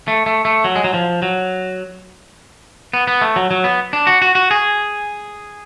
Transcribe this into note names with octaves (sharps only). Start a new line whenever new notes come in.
A3
A3
A3
F#3
G#3
F#3
F3
F#3
B3
B3
A3
F#3
F#3
B3
D4
F#4
F#4
F#4
G#4